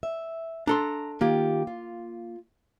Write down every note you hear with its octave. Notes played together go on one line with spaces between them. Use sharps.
E5
D4 A4 A#5 C6
D#3 A#3 F4 G4
F4